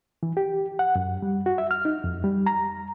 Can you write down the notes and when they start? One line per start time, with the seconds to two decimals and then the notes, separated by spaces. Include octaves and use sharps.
0.23 E3
0.37 G4
0.79 F#5
0.95 F#2
1.22 G3
1.46 F#4
1.58 E5
1.71 F6
1.85 D#4
2.04 F2
2.24 G3
2.46 A#5